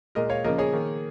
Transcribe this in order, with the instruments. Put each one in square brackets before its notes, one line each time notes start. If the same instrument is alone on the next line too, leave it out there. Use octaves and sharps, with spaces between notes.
[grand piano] A#2 G#3 A#4 D#5
C#5 F5
C#3 F3 A#3 A#4 D#5
G#4 C#5
D#3 A#3